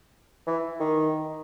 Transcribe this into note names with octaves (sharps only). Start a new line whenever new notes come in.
E3
D#3